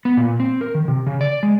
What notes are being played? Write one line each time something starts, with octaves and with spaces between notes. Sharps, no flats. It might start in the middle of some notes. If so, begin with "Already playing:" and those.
B3
A#2
C4
A#4
D#3
C3
C#3
D5
G#3